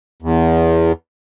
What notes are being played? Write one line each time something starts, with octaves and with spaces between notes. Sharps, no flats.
E2